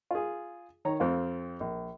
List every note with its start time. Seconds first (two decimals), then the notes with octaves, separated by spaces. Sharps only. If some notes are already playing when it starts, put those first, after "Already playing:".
0.11 F4 G#4
0.85 D#3 C#5 A#5
1.00 F2 C4 F4
1.60 A#1